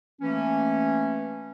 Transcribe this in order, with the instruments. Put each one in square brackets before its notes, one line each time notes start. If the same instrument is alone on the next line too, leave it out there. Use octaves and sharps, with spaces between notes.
[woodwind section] E3 A3 A#3 C#4